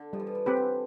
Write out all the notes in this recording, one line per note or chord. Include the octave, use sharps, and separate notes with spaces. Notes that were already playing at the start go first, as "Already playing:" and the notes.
Already playing: D3
F3 G3
E3
F3
E3
C4 G4 B4
D3